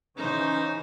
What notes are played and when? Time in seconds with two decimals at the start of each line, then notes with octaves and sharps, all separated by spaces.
0.17 C#3 E3 C#4 D#4 C5